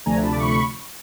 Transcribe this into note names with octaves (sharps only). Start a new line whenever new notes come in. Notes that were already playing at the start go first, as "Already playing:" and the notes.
D2 C3 F3 A3 D4 G#5 A#5
A5 B5
D6
B5 C#6